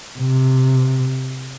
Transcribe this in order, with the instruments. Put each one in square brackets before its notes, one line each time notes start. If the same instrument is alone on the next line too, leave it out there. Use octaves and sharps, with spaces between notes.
[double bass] C3